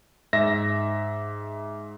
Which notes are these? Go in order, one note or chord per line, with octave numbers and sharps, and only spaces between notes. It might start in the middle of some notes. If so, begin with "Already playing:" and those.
G#2 E5 A#6